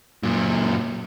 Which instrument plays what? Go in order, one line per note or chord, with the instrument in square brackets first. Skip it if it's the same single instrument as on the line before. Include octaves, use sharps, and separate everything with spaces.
[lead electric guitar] F#2 A#2